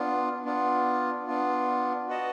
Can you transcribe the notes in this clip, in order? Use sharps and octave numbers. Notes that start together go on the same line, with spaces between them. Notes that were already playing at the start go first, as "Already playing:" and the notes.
Already playing: B3 D4 F4
B3 D4 F4
B3 D4 F4
F#4 B4 D#5 F#5 A5